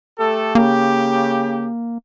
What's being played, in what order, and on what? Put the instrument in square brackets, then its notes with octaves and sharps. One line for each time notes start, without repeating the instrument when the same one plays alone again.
[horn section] A3 G4 A4
[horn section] C#3 G4 [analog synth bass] A#3